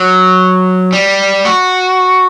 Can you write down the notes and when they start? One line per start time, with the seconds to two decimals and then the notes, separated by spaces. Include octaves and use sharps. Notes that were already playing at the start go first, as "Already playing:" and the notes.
Already playing: F#3
0.93 G3
1.45 F#4